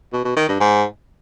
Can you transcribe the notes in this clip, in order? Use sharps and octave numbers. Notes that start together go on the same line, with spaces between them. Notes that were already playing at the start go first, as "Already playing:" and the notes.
B2
B2
D#3
G2
G#2